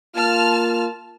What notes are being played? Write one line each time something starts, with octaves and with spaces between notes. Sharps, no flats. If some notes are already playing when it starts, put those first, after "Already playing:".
A#3 F4 A5 F6